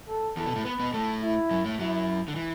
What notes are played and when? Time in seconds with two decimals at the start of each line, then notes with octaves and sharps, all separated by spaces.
0.09 A4
0.37 E2 E3 A4
0.46 B2 B3
0.56 A2 A3
0.65 B3 B4
0.80 B2 B3
0.93 A2 A3 A4
1.23 E4
1.51 F#2 F#3
1.65 A2 A3
1.79 F#2 F#3 E4
2.28 D3
2.36 E3